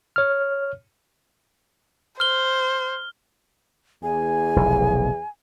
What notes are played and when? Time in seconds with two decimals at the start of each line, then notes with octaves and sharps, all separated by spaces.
0.16 C#5 F6
2.20 C5 F6 G7
4.03 E2 G#4 G#5
4.56 F1 B1